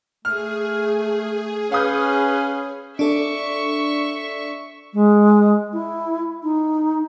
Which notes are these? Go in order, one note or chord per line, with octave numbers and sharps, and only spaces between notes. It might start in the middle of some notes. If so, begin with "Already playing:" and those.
A3 G#4 F6
C#4 B4 F5 D#6 G6
D4 A4 D5 E5 C#6
G#3
E4
D#4